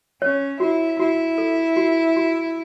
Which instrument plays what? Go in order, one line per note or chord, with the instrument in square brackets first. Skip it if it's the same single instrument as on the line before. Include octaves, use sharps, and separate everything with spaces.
[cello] C#4 [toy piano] C#5
[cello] E4 [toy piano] F#4
[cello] E4 [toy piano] F#4
[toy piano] A4
F#4
F#4